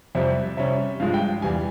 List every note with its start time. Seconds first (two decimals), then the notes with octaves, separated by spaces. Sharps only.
0.15 F2 C3 G3 C4 E5
0.57 C3 G3 C#4 E5
1.00 G2 F3 G#3 F5
1.14 G5
1.42 E2 E3 G3 G#5